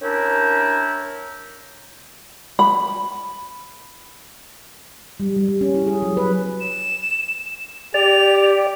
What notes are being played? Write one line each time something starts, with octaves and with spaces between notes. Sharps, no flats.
C#4 D4 E4 G4 A#4
B5
G3
G3
G3
C#4
E4
G#4
F#3
B4
E7
G4 D5 F7